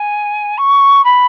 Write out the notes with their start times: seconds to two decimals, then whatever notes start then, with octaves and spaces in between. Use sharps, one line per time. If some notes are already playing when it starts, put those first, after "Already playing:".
Already playing: G#5
0.57 C#6
1.04 B5